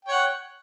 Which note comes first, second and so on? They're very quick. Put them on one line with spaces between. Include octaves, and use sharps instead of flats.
G5 C#5 F#5